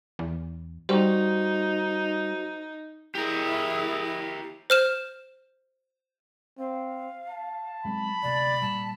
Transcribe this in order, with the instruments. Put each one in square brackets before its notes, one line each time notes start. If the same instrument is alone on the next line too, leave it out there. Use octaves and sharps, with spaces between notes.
[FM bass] E2
[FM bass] G3 [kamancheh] D#4 [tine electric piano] F#4 C5
[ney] E4 [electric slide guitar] G4 A#4 [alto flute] G#4
[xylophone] C5 F6 E7
[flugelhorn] C4 [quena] F5
[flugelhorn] A5
[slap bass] F#3 G#3 C4 [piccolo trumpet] B5
[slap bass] D2 C3 A3 [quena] D5
[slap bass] A#2 G3 [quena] A5